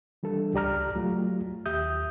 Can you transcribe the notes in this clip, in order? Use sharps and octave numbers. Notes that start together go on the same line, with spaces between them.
E3 G3 D4 A4
C#2 G4 D5 A#5 F6
F#3 A3 F4 G4
D#2 G4 E5 D#6 G6